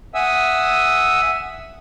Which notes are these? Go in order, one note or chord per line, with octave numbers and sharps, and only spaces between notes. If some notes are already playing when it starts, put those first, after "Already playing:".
E5 F#5 G#5 D#6 E6